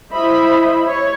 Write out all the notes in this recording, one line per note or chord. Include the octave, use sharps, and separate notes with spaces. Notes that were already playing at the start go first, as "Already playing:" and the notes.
E4 C5 D#5 E5 B5
C#5